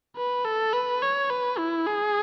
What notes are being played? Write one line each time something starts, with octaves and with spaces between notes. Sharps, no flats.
B4
A4
B4
C#5
B4
E4
G#4